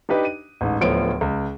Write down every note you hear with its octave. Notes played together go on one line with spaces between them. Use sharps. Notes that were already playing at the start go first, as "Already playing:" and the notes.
D4 D#4 G4 B4 D#5
D#7
A1 G#2
D1 F3 A3 B3 C#5 D7
C#2